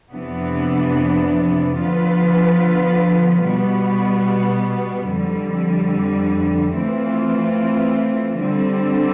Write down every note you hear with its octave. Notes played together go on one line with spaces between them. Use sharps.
F2 C3 E3 B3 D4
D3 F3 B3 F4 B4
B2 G3 B3
F2 D3 G3
E3 A3 C4 F4
D3 G3 C4